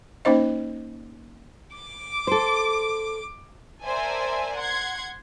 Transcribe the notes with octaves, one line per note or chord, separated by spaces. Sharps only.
A#3 C#4 D#4 C5 D#5
D6
A4 C5
A#4 C5 D5 E5 G#5 A5
F#5 C6 G#6